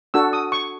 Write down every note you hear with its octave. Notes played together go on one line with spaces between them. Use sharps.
D4 F#4 A4 E6
D#6
C#6